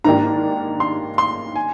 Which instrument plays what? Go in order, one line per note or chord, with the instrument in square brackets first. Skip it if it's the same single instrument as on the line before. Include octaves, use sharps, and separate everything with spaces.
[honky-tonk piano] G#2 D#3 A#3 D4 G4 [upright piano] A#5
[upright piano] C6
C6
G#5